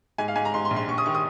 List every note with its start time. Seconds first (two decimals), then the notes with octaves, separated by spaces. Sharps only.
0.18 G#2 G#5
0.28 F5
0.36 G#2 G#5
0.45 A#5
0.54 G#2 C6
0.65 C6
0.71 A#1
0.76 C6
0.88 A#1 C#6
0.98 D#6
1.06 D#3 C#6
1.15 D#6